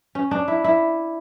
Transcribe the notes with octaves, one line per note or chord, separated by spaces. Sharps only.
C#4
D4
E4
E4